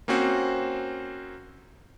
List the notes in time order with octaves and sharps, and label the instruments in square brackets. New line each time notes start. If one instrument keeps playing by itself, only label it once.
[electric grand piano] A#3 C4 C#4 F#4 C5